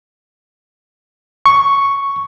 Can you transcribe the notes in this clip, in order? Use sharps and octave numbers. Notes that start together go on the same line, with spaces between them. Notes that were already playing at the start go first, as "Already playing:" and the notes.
C#6